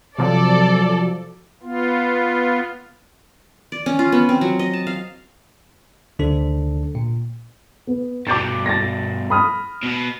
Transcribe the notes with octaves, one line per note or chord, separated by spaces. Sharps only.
C3 F3 F#3 A4 D5
B3 F4
D5
C#4
F4
B3
C4
F#3
D#5
A5
F5
D2 D3 D4 A4
A#2
B3
G2 B2 D6 G6 A6
A6 A#6
B5 D#6 F6
B2 B3